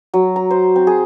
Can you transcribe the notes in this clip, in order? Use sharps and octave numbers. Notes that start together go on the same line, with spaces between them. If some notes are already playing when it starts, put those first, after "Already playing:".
F#3
A#5
C5
C4
G#4